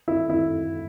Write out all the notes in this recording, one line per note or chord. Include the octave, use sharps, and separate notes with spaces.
E4
E4